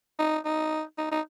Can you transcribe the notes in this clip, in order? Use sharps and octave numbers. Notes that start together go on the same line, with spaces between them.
D#4
D#4
D#4
D#4